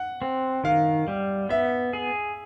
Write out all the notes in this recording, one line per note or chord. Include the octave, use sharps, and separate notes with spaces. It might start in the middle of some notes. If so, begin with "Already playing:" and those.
Already playing: F#5
C4
D#3 F5
G3
B3 E5
G#4